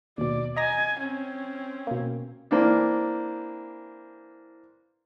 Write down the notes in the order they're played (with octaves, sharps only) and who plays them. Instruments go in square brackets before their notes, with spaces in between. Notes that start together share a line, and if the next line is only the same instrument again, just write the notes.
[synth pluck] D#2 B2 [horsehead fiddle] D5
[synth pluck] D#5 A#5 A#6 [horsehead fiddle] G#5
[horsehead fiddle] C4 C#4
[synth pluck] B2 A#3
[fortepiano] E3 A#3 C4 D4